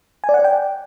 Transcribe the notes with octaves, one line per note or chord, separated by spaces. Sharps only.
G#5
D5
F#5
D5
G5